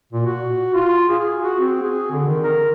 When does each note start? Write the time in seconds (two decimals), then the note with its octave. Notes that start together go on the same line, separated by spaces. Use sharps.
0.13 A#2
0.26 F#4
0.74 F4
1.09 G#4
1.41 F#4
1.60 C4
1.83 G#4
2.11 D3
2.27 D#3
2.44 A#4